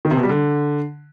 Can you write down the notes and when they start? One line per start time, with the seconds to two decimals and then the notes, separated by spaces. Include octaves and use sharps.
0.05 D#3
0.11 C3
0.17 B2
0.23 G3
0.29 D3